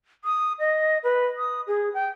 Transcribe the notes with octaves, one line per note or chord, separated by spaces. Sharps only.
D#6
D#5
B4
D#6
G#4
G5